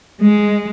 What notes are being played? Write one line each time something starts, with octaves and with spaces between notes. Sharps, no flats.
G#3